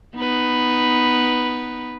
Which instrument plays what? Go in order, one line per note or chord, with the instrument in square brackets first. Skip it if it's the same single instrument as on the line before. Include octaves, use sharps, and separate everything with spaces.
[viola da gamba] B3 D#4 B4